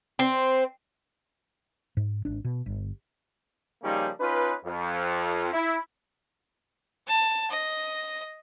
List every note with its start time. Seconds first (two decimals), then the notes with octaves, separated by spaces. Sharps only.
0.19 C4
1.97 G#2
2.25 G#1 D4
2.44 B2
2.66 G1
3.83 C#3 F3 G3 A#3 C#4 D#4
4.20 C#4 D#4 F4 B4
4.64 F2
5.53 E4
7.07 A5
7.50 D#5